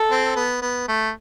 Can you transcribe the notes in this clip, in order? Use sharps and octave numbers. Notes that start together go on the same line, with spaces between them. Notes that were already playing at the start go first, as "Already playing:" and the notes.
Already playing: A4
C4
B3
B3
A3